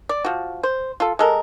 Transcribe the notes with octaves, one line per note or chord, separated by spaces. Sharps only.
D5
F3 F#4
C5
F4 A4
G#3 A4 A#4